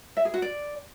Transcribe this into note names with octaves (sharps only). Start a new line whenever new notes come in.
E5
G#4
F#4
D5